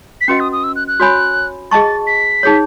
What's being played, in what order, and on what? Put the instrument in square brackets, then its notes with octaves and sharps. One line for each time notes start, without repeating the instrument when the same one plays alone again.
[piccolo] B6
[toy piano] C#4 F#4 B4 D#5 F#5 [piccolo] C#7
[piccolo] D#6
D#6
E6
F#6
F#6
[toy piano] F#4 C#5 G#5 B5
[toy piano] G#4 D#5 A5 C#6 [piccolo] A6
[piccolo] B6
[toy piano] D#4 G#4 C#5